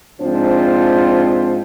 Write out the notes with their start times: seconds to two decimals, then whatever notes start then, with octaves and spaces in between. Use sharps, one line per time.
0.21 G#2 F3 C4 D4 F4 C5